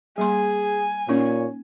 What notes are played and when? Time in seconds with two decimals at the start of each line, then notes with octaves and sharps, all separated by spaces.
0.18 G3 A#3 G#4 G#5 C6
1.09 A#2 A#3 C#4 D#4 C#5